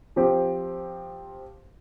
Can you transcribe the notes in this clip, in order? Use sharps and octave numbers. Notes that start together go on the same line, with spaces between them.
F3 C4 G4